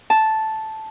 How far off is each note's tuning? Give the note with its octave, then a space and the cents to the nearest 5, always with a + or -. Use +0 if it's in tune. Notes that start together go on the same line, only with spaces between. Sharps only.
A5 -5